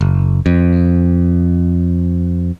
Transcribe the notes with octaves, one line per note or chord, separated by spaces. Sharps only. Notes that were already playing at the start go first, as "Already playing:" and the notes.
F#1
F2